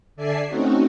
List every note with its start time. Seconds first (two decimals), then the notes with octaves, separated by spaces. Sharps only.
0.16 D3 A4 D5 E5 G#5 C7
0.47 A3 C4 C#4 D#4 F#4